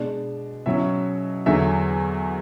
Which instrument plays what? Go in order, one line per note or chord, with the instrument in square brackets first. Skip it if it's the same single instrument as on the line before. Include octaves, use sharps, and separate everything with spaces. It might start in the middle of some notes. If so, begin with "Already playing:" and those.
Already playing: [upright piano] B2 G#3 D4
B2 F#3 C#4 E4 E5
E2 D3 F#3 E5